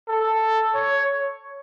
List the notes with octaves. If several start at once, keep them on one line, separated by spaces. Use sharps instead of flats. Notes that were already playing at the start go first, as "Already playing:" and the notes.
A4
C#5